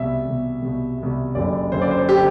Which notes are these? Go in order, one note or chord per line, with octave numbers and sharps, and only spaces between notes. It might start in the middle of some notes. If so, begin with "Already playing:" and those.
Already playing: C2 B2 E5
C2 B2
C2 B2
C2 B2
F#1 F#2 D3 D5
F#1 F#2 D3 C5
D5
C5
D3 G4